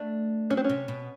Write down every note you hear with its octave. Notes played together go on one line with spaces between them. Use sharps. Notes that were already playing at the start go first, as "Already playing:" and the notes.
Already playing: A3 D4
F#3 C#4
C4
C#4
C3
B2